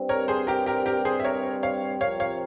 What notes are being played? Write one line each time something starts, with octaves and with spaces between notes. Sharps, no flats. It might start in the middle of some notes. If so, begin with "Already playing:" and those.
Already playing: G2 G3 C4
A#4 C#5
G#4 C5
G4 A#4
G4 A#4
G4 A#4
G#4 C5
E5
A#4 C#5
C#5 F5
C3 F3 C4 G4 A#4 C#5 F5
C#5 F5